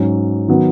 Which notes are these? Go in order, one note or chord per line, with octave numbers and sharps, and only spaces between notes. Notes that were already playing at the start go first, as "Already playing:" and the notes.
Already playing: G#2 F#3 C#4
D#3 F#3 B3 F#4